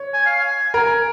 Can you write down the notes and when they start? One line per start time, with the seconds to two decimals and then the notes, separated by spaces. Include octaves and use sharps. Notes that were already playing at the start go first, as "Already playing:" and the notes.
Already playing: C#5
0.14 G#5
0.26 F5
0.36 G#5
0.74 A#4 G#5